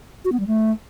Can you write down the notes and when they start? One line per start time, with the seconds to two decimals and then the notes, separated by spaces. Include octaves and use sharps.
0.25 F#4
0.32 B3
0.40 G3
0.47 A3